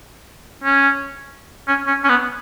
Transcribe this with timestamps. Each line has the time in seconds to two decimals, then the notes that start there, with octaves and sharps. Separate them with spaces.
0.64 C#4
1.68 C#4
1.87 C#4
2.04 C#4
2.09 B3